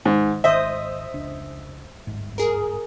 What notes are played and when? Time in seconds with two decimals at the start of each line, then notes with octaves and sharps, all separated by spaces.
0.05 G#2 D#3
0.44 G#1 G#2 D#3 C5 D#5 E5 D#6
1.14 F1 C#2 D4
2.07 D1 G1 G#2
2.38 G#4 A#4